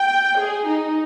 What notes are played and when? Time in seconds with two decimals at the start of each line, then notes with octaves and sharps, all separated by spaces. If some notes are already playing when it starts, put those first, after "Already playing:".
Already playing: G5
0.38 G#4
0.67 D#4